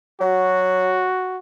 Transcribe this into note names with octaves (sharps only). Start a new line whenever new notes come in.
F#3 F#4